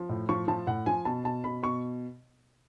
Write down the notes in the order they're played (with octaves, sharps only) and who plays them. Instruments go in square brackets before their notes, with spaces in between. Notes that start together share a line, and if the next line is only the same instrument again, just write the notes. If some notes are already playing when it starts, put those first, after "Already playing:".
Already playing: [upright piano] F3
A2
F3 C#6
F3 A5
A2 F#5
F3 G#5
B2 A5
B2 A5
B2 B5
B2 C#6